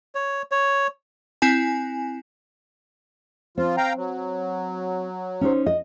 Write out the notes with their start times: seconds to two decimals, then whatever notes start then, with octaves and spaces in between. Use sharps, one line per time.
0.15 C#5
0.52 C#5
1.42 C4 E4 G#5
3.57 F3 C4 F4
3.77 F5 G5 A#5
3.96 F#3
5.41 C#4 D#4 C5
5.66 D#5